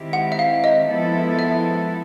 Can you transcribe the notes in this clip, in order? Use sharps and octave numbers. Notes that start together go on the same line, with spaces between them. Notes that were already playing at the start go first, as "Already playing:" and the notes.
Already playing: D#3 G#3 C4 E4 G4
F#5
E5
F5
D#5
F3 G#3 B3 E4 A4
E5